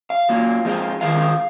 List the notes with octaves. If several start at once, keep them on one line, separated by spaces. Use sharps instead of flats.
F5
F#3 A#3 F4
F3 G#3 C4 F4
D#3 G#3 C4 F4 F5